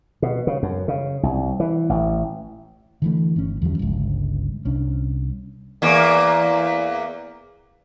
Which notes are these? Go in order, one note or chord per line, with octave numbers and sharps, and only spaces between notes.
B2
C#3
F#2
C#3
C2
E3
A1
D3 E3 A3
G1 C#4
E2 D3 F3 G3
G1 C#2
C2 C#4 D4
E2 A#3